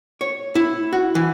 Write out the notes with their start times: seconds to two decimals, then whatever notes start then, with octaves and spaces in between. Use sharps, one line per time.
0.21 C#5
0.55 E4
0.93 F#4
1.15 E3